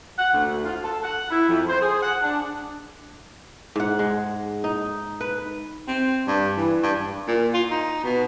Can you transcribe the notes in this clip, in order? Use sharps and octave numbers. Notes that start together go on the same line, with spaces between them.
F#5
D2
F4
A4
F#5
E4
F2
C5
G#4
F#5
D4
G#2 F#5
G#3
D#4
B4
C4
G2
E3
G2
A#2
F4
D#4
B2